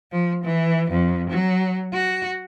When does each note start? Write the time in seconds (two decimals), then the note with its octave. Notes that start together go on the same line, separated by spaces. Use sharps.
0.12 F3
0.44 E3
0.90 F2
1.30 F#3
1.93 F#4